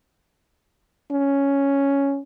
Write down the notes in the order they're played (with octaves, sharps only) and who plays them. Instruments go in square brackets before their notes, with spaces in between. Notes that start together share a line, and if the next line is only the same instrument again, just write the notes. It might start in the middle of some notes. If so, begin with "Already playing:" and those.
[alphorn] C#4